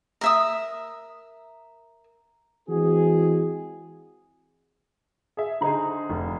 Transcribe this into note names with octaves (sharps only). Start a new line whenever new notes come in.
A#4 E5 D#6
E3 G#3 C4 F#4 G#4
G#4 E5
D3 D#4 G#4 C5 A#5
F1